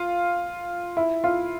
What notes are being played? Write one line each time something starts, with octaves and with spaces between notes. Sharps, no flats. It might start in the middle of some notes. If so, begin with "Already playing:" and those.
Already playing: F4
E4
F4